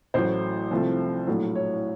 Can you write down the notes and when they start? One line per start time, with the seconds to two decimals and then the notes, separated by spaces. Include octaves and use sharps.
0.14 A1 A2 F#3 C5
0.71 C2 C3 F3 A3
1.27 A#1 A2 F#3 A3
1.55 C#5